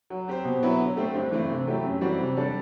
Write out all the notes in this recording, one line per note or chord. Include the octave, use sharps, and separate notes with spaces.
F#3
C4 G4 C5
B2
F#3 B3 E4
D3
A3 C4 G4 C5
G2
E3 A3 C4
C3
F#3 A3 E4 G4
F#2
E3 G3 C4 F#4
C3
G3 D4 A4